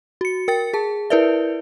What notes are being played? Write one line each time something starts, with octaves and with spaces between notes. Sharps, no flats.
F#4 C#7
A#4 G5 A6 C#7
G#4 A5
E4 A#4 B4 D5 E5